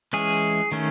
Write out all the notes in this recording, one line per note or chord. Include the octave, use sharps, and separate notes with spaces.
E3 G#3 C#4 G#4
D#3 A3 C#4